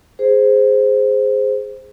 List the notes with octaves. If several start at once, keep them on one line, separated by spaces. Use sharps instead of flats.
G#4 C5